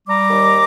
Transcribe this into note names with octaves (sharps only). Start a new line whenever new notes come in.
G3 A#5 D6
D#2